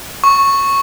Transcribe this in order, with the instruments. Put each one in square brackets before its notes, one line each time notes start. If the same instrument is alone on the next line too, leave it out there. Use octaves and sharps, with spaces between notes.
[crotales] C#6